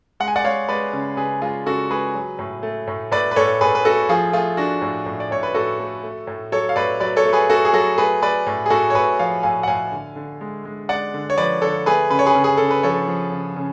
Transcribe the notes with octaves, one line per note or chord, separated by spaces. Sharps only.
G#3 F#5
G#5
D5 F#5
G#3 C#5 F5
G#3 B4 D5
C#3
C#3 G#4 B4
G#3 F4 G#4
C#3 F#4 A4
G#3 G#4 B4
F#3
A2
A3
A2
A2 B4 D5
B4
A2 A4 C#5
A2 G#4 B4
B4
A3 F#4 A4
F3 F4 G#4
A3 F4 G#4
A3 D4 F#4
A2
A2
D5
A2 C#5
B4
A2 F#4 A4
A3
A3
A2
F#3 A4 C#5
F5
A2 B4 D5
F#3 B4 D5
A4 C#5
A3
G#4 B4
A3 F#4 A4
G#4
F#3 F#4 A4
A3 G#4 B4
A3 B4 D5
A2
G#4
A2 F#4 A4
C#5
A2 G#4 B4
F3 C#5 F5
A2 F5 G#5
F#5
A2 F5 G#5
D3
D3
G#3
G#3
G#3 D5 F#5
D3
C#5
F3 B4 D5
D3 A4 C#5
A3 G#4 B4
C#3 B4
C#5
G#4 B4
C#3
G#4
C#3 A4
B4
F3 A4 C#5
F3
C#3
C#3